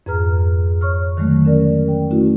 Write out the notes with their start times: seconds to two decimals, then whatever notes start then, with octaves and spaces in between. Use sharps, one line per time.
0.06 F2 G#2 G#4 B4 A#5 F6
0.81 C#5 C#6 F6
1.17 D3 D#3 F#3 G#3 A3
1.45 C#4 A#4 D5
1.88 G5
2.11 A3 C#4 E4 F#4